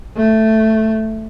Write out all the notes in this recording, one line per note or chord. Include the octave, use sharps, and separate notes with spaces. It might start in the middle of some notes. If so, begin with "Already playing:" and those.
A3